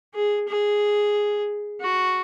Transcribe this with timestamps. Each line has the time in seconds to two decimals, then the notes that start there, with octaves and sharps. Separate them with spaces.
0.15 G#4
0.48 G#4
1.81 F#4